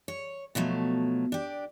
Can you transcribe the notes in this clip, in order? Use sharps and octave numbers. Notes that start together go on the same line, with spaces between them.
C#5
B2 F3 F#3 A3
D4 G4